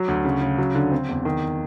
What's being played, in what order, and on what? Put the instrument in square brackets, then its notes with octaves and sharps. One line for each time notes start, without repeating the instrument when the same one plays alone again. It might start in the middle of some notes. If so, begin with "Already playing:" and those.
Already playing: [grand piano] F#3
D2
C#3
C#3
F#3
D3
C4
E2
D#3